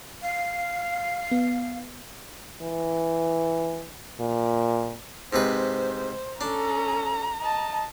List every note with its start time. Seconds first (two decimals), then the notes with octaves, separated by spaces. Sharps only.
0.21 F5
1.31 B3
2.62 E3
4.20 A#2
5.33 G#2 C3 B4 C5
6.41 C#4 D4 A4 A#5
7.41 D#5 A5